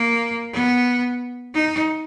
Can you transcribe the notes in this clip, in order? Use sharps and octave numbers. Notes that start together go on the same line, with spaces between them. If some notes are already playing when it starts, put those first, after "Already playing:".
Already playing: A#3
B3
D#4